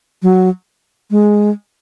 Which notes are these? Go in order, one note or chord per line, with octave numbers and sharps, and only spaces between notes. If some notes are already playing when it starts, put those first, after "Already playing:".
F#3
G#3